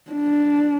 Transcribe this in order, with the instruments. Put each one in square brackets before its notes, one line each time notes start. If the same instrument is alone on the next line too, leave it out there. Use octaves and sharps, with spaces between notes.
[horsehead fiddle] D4